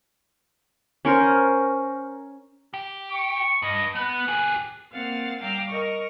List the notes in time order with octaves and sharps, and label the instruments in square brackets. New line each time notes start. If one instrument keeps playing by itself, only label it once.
[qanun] C#4 A#4 C5
[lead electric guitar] G4
[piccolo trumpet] C#6
[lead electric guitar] G2 [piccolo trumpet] D#5
[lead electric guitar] B3 [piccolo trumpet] F#6
[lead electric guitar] G4 G#4
[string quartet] A#3 C4 F5 F#5 A6
G3 F5 G5 A#5 D6 E6
A#4 D#5 C#6